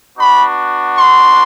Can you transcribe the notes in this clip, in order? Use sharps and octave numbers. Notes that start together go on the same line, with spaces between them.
B3 D4 F#4 B5
C6